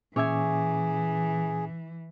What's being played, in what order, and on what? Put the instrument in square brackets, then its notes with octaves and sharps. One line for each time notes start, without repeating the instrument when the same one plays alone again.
[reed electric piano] A#2 C#4 D6 [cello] E3 [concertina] G#4 [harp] C#5 E5 G#5